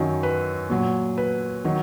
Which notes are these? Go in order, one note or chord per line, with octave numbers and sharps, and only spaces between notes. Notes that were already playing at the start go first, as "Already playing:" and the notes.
Already playing: F#2 D#3 F#3
B4
A#2 F#3
B4
D#3 F#3